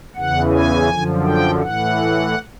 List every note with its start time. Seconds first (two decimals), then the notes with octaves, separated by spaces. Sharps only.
0.16 E2 C#3 E3 F#5
0.52 G#5
0.88 F#2 D3 F3
1.25 G5
1.61 A2 E3 F#5